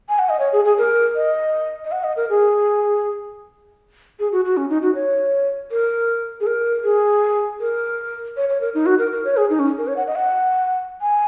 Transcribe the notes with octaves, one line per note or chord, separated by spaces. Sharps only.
G#5
F#5
D#5
C#5
G#4
G#4
A#4
D#5
D#5
F#5
D#5
A#4
G#4
G#4
F#4
F#4
C#4
D#4
F#4
C#5
A#4
G#4
A#4
G#4
A#4
C#5
C#5
A#4
D#4
F#4
A#4
A#4
C#5
G#4
D#4
C#4
A#4
C#5
F#5
D#5
F#5
G#5